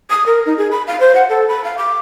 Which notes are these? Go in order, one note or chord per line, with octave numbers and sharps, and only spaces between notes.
D#6
A#4
D#4
G#4
B5
F5
C5
F#5
A4
B5
F5
D6